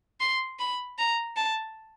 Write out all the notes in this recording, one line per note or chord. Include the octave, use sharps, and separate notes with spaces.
C6
B5
A#5
A5